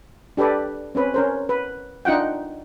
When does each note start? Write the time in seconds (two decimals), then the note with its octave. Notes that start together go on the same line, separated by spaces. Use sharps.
0.37 D4 G4 A4 B4 D5
0.95 C4 C#4 B4
1.14 C#4 A#4 C5
1.49 B4
2.05 D4 D#4 F4 F#5 G5